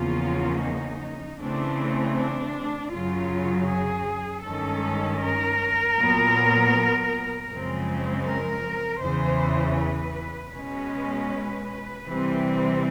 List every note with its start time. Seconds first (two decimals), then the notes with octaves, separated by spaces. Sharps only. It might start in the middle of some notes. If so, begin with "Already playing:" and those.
Already playing: E2 C#3 F3 A#3 C#4 F4
0.63 D#4
1.40 C#3 E3 A3 C4 D4
2.16 D4
2.92 F#2 C#3 F#3 F4
3.68 G#4
4.44 G2 D#3 G#3 C#4 A4
5.21 A#4
5.96 A#2 F#3 B3
7.49 F#2 C#3 F3 G#3 C4
8.25 A#4
9.01 E2 C#3 E3 C5
9.78 B4
10.54 B2 G#3 C#4 B4
12.06 C3 E3 G3 C4